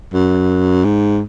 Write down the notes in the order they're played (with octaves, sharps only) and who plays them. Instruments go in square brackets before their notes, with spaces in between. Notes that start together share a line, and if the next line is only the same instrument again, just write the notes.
[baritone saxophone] F#2
G#2